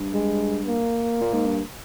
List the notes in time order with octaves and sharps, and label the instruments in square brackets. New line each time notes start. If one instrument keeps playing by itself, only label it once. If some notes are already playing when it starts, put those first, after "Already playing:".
Already playing: [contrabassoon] G2
[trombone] G#3
A#3
[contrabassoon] A#2
G#2
G2